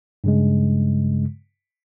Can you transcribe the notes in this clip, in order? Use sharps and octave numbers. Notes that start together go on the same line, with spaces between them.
G2 C#3 G#3